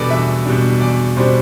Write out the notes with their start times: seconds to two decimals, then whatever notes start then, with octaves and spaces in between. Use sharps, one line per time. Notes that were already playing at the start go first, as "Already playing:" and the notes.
Already playing: E2 B2 G3 D4 A4 B4 D5
0.10 E2 E5
0.46 B2 G3 D4
0.81 E2 D5
1.16 B2 G3 D4 C5